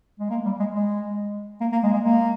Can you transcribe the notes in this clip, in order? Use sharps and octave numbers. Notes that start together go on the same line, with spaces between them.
G#3
A#3
G3
G#3
G#3
A#3
A#3
G#3
G#3
A#3